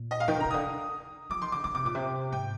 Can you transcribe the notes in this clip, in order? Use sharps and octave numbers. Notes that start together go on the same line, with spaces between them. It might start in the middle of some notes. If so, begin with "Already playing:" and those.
Already playing: A#2
D#5
F5
D#3 G5
D3
C3 A#5
D3 D#6
F3 D6
D#3 C6
D3 D6
D3 D6
C3 D6
A#2 D6
C3
G#2 G5